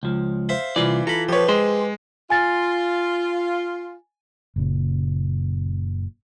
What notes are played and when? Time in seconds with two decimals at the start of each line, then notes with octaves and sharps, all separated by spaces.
0.03 C#2 F3
0.49 C5 E5 F5
0.76 C2 E3 F4 D5
1.07 F4 A4 A#5 B5
1.29 F3 G4 B4 C#5
1.48 G#3 G#4 C5
2.30 F4 G#5 A6
4.56 F#1 A#2 C#3